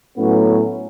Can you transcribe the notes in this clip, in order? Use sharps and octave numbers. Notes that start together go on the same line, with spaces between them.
A2 F#3 B3 C#4